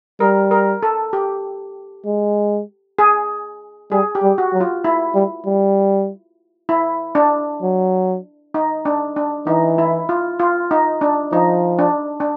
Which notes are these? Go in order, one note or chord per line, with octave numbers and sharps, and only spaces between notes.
G3 A#4
A#4
A4
G4
G#3
G#4
G3 G#4
G4
G3
F#4
F#3
F4
E4
G3
G3
E4
D4
F#3
D#4
D4
D4
E3 D#4
E4
F4
F4
D#4
D4
F3 D#4
D4
D4